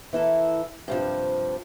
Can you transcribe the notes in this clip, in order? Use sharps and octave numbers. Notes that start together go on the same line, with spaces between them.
E3 E4 A4 A#4
G2 C3 F3